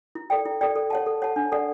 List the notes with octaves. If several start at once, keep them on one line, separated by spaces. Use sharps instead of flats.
E4
A4 D5 G5
E4
A4 D5 G5
A4
C#5 F#5 A5
A4
C#5 F#5 A5
D4
A4 D5 F#5